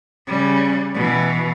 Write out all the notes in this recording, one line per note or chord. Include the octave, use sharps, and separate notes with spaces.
C#3 G3
B2 E3